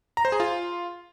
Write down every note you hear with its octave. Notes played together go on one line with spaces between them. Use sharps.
A#5
C5
G#4
F4